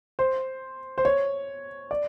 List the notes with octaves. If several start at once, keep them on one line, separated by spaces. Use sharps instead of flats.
C5
C5
C#5
D5